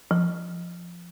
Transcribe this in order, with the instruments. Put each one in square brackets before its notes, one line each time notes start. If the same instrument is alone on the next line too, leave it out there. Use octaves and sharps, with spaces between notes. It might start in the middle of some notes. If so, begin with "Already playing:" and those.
[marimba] F3